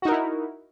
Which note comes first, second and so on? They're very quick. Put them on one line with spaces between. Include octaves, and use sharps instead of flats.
F#4 D#4 A#4 E4